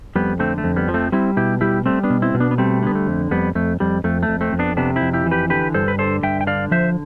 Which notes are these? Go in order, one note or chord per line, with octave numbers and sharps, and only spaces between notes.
F2 G3 B3
D3 A3 C4
A3
F2
G3 B3
F3
A3 C4
G3 C4 E4
B2 E4 G4
G3 E4 G4
G3 A3 C4
B3 D4
B2
C4 E4
B2
B3 D4
B3
G3 A3 C4
D3 B3
A3
F2
F2 G3 B3
F2 A3
F2 G3
F2 A3
A3
F2
A3 C4
F2
B3 D4
C3 B3 D4
C4 E4
F2
E4 G4
E3
G4 B4
D3 G4 B4
G2 A4 C5
B4
D3 A4 C5
G2 E5 G5
G5
D3 D5 F5
F3 C5 E5